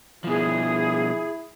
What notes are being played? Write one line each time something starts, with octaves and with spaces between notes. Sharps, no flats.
B2 F3 E4 G#4